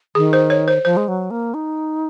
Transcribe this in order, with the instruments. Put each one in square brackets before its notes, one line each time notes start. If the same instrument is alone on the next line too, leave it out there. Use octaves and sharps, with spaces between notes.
[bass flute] D#3 [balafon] G#4
[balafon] C5
C#5
C5
[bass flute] F3 [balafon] C5
[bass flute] G#3
F#3
A#3
D#4